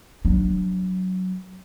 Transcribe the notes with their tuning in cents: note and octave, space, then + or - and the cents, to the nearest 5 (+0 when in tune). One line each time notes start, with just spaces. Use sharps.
F#3 +0 D4 +0